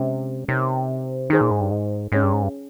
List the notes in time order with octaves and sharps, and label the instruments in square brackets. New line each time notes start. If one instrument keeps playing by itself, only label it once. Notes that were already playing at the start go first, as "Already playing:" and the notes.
Already playing: [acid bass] C3 [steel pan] G#3 C#4
[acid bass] C3 [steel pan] C4 D#4 A#4 C#5
[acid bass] D#3 [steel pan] D#4 G#4 C5
[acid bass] A#2
G#2
G2
G#2
[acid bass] G#2 [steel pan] C#4 G#4 C#5 G5
[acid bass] G2
G#2
G2